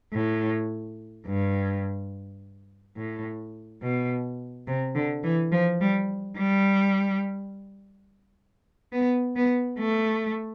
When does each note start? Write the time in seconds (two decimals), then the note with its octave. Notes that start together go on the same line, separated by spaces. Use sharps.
0.13 A2
1.26 G2
2.97 A2
3.82 B2
4.67 C3
4.95 D3
5.24 E3
5.52 F3
5.81 G3
6.38 G3
8.93 B3
9.36 B3
9.78 A3